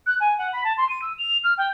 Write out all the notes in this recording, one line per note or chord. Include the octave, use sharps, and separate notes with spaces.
F#6
G#5
F#5
B5
A5
C6
D#7
E6
F7
F6
G5